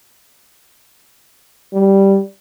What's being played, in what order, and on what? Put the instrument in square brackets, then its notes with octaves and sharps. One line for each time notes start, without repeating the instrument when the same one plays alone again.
[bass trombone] G3